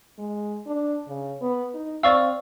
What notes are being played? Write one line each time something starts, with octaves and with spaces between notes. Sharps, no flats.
G#3
D4
C#3
B3
D#4
C4 D5 F5 C#6 E6